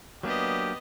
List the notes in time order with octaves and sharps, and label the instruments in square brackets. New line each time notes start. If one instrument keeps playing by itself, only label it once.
[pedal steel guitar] F#3 A#3 D4 [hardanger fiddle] B3 D#5 [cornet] G4